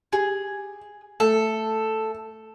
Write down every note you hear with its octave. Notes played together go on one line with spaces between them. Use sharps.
G4 G#4
A3 A4